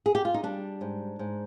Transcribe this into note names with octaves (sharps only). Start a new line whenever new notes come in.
G#4
G4
F4
D#4
G3 D4
G#2
G#2